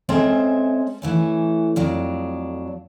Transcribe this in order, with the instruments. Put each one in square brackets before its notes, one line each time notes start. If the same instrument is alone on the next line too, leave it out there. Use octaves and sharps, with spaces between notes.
[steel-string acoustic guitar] G#3 C4 C#4 A4 C5 E5
E3 A3 C#4
F2 F#3 D4